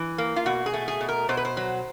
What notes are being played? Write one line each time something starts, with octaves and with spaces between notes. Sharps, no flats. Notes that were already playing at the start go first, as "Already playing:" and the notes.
Already playing: E3
A#3
F4
B2 F#4
G#4
A3
G#4
B2
A#4
B2 C5
B4
C5
F#3